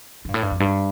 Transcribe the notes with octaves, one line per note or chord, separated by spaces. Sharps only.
D#3
G2
A2
G2
F2
G2